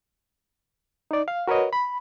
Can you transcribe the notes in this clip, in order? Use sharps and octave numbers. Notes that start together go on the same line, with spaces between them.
D#4 D5
F5
F#4 A#4 B4 C#5 D#5
B5